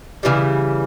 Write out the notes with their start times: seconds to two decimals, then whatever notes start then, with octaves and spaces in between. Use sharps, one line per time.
0.23 C#3 E3 G3